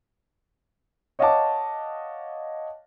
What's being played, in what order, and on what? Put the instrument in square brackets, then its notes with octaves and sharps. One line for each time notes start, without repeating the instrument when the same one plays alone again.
[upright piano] C#5 D#5 F5 F#5 A5 D6